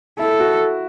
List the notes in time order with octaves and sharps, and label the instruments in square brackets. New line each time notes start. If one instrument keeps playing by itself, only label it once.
[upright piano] E4 [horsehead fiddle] A4
[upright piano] F#4